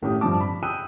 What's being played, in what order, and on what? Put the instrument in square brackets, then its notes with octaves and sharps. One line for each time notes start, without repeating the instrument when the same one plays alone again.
[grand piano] G#1 A2 C#4 G4 D#6
G2 F3 C4 A5 D6
B5
G5 B5 D#6 E6 F#6 D#7